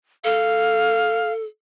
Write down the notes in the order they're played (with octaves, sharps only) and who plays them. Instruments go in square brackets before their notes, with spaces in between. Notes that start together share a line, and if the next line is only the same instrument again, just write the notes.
[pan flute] A4 [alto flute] F5